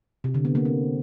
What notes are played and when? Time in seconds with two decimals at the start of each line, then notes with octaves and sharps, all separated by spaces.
0.24 C3
0.34 D3
0.45 B3
0.55 A#3
0.65 C4